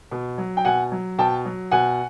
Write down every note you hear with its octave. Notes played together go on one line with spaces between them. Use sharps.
B2
F#3
G5
B2 F#5 G#5
F#3
B2 G5 A5
F#3
B2 F#5 G#5